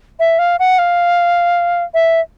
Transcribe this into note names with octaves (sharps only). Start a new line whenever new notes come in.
E5
F5
F#5
F5
E5